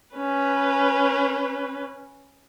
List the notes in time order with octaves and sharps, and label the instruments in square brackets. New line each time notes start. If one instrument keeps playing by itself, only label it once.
[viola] C#4 B4